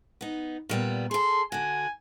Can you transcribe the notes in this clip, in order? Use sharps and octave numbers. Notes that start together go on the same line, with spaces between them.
B3 D#4
A#2 G3 B3
G#4 A4 C6
D3 F#4 G#5